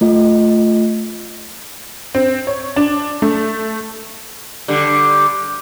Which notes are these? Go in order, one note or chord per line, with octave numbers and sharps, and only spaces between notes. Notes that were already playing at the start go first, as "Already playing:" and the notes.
A3 F4 D#5
C4
C#5
D4
A3
D3 G3